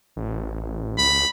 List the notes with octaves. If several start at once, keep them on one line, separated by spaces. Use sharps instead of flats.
A1
C#2 B5